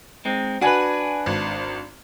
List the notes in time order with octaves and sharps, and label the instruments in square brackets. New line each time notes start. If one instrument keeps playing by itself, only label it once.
[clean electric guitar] G#3 C4 D#4
[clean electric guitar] D4 B4 [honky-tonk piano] F#4 G#5
[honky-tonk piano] G#1